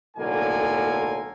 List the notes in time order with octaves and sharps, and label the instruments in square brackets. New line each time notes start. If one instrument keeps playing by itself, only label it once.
[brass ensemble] B1 A2 D3 A#3 A4 G#5